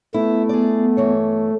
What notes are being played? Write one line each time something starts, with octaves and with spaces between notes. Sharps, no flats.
A3 B3 E4
G#4 D5
G2 E3 C#5